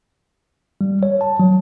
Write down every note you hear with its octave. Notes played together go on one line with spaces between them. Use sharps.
G3
C#5
A5
F#3